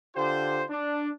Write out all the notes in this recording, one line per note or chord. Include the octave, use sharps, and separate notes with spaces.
D3 F4 G4 C5
D4